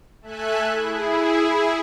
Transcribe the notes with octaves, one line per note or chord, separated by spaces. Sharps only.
A3 A4 E5 G#5 F#6
E4 G#4